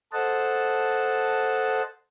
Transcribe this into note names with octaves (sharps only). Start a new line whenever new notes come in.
A4 C5 D#5 F#5 A5